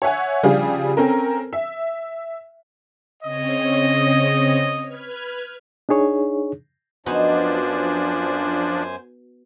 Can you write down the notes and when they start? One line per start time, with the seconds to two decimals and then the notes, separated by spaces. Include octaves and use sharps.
0.02 C#5 E5 F#5 G#5
0.43 C#3 F3 G3 D4 F4 G#4
0.97 C4 C#4 A4 A#4
1.53 E5
3.23 C#3 C4 C#5 D#5
4.85 B4 F6 G#6
5.89 D4 D#4 G#4 C#5
7.06 F#2 F3 B3 D4 D#4 F#4 C5 G#5